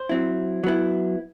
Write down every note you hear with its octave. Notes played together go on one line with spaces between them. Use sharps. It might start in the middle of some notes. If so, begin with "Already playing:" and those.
Already playing: C5
F#3 C4 E4
F#3 B3 E4